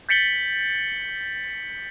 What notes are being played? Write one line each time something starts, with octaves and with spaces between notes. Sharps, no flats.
G6 A6 B6 C#7 F#7 G7